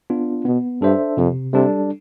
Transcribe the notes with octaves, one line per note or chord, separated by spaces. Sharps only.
B3 D4 F4
B2 B3
G2 D4 A4 C5 E5
F2 C3
C3 G3 D4 A4